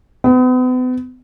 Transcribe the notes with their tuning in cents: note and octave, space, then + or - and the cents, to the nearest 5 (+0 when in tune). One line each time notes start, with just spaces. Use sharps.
B3 +40